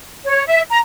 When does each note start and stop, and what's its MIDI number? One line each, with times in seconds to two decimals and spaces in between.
0.25 0.44 73
0.47 0.61 76
0.70 0.78 82